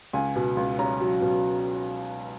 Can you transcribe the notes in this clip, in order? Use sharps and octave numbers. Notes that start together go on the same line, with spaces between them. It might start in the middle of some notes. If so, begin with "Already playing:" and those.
C#2 G#5
B2
C#2
C#4 A#5
F#3
B2